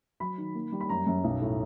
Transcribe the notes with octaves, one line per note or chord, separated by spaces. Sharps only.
F#3 B5
D#3
A#3
G3
B5
F#2 A#5
F#2
B1
A2